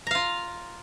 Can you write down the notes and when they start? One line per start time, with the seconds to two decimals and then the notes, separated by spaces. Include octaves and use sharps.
0.07 A#5
0.11 F5
0.15 F4